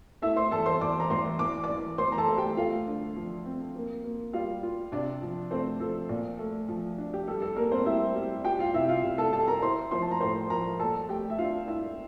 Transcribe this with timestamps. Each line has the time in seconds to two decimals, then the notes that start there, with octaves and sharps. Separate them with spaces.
0.22 A3 E4 E5
0.36 C5 C6
0.51 E2 A4 A5
0.66 C5 C6
0.81 E2 D5 D6
1.00 A#5
1.10 E2 C5 C6
1.39 E3 D6
1.63 D5 D6
1.69 E3
1.98 E3 C5 C6
2.12 A#5
2.18 A4 A5
2.28 A3
2.38 G4 G5
2.57 A3 F4 F5
2.87 D3
3.16 F3
3.46 C4
3.75 A#3
4.04 A#3
4.33 G3 F4 F5
4.63 F4
4.92 C3 D4 D5
5.22 F3
5.51 A3 C4 C5
5.80 F3 A4
6.09 A#2
6.39 A3
6.68 F3
6.98 D4
7.14 G4
7.27 G3 A4
7.42 A4
7.56 G3 A#3 A#4
7.72 C4 C5
7.86 G3 E4 E5
8.15 G3
8.44 F4 G4 G5
8.59 F4 F5
8.74 C3 E4 E5
8.89 F4 F5
9.03 C3
9.18 A4 A5
9.32 G3 A4 A5
9.48 A#4 A#5
9.62 E4 C5 C6
9.91 F3 C5 C6
10.02 A5
10.11 A#5
10.20 A2 C5 C6
10.50 F3 A#4 A#5
10.79 A#2 A4 A5
11.08 A3 G4 G5
11.30 E5
11.38 D4 F4 F5
11.68 D4 E4 E5